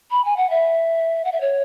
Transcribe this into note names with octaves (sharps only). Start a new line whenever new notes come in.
B5
G#5
F#5
E5
F#5
E5
C#5